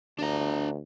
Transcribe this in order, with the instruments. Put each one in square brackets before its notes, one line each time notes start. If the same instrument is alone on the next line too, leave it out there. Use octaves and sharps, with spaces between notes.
[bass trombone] D2 [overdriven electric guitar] D4 A#5